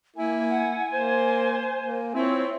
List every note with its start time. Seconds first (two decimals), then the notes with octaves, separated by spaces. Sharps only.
0.16 A#3 E4 G#5
0.49 F#5
0.91 A#3 C5 C6
1.80 A#3
2.15 C4 E4 F4 C#5